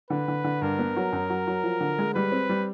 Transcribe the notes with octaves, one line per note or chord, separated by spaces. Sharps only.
D3 B4
D3
D3
G2 A#4
B3
F#3
F#2
F#3
F#3
F3
D3
G#3
G3 B4
C4
G3